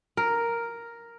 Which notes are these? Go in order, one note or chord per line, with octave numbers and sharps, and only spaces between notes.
A#4